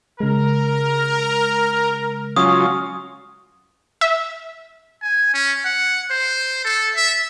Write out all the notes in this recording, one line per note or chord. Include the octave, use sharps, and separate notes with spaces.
C#3 G#3 A#4
F#3 C#4 F4 D#6
E5
G#5
C#4
F#5
C5
A4
E5